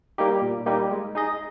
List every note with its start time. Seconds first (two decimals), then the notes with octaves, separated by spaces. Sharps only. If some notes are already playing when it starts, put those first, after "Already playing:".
0.18 G3 A#3 D#4 G4
0.42 A#2
0.66 G3 A#3 D#4 G4
0.91 G#3
1.15 D#4 G#4 D#5